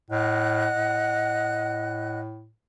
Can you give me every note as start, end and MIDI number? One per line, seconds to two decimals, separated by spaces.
0.10 0.68 45
0.10 2.20 75
0.10 2.20 78
0.10 2.20 90
0.73 2.50 45